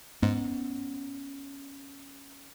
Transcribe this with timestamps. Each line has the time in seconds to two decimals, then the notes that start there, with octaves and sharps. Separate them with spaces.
0.22 G#2 B3 C#4